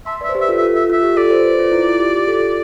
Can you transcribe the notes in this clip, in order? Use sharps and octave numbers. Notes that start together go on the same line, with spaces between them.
E5 A5 C6
B4 D5 E5
C5
G4 B4
E5
F4 A4
E5
F4 A4
F4 E5
F4 E5
G4
F4 A4 D5
A4 C5
B4
A4 C5
F4
E4
F4
G4
G4
F4 A4